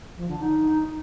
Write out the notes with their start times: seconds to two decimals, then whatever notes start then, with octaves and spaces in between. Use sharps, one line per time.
0.17 F3
0.28 D3
0.40 D#4